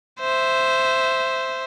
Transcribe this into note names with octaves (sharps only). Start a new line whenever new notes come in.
C5 E5